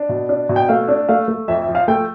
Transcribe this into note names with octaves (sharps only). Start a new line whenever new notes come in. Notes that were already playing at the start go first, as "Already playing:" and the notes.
Already playing: D4
B2
D4
B2
G5
A3 F5
D4
A3 F5
A3
F2 E5
E5
F3
F5
A3 G5